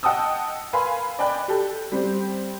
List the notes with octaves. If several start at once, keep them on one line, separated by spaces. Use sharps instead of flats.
D#5 F#5 G5 A5 D#6 E6
A#4 B4 F5 G#5 B5 C6
D5 D#5 G5 G#5 B5 F#6
G4 A4
G3 C4